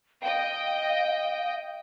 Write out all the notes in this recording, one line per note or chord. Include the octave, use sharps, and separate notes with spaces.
D#5 F5 G5